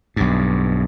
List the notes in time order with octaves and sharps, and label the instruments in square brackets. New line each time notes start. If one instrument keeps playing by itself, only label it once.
[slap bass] B1 G2